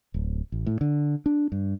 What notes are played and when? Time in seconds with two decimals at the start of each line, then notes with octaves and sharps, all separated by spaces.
0.14 D1
0.52 A1
0.66 A2
0.81 D3
1.26 D4
1.52 G2